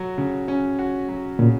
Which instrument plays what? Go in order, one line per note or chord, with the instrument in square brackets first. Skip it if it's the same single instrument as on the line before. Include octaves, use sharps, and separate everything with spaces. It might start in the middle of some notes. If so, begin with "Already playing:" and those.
Already playing: [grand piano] F#3 F#4
C#3
C#4
F#4
F#3
[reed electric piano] A#2 [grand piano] C#3